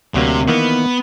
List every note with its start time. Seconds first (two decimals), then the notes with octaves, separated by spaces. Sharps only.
0.14 D2 C3 F#3 A#3
0.48 D#3 E3 A#3 B3